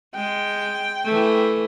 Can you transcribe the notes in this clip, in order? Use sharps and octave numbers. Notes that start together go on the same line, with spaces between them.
G#3 G5
E3 A3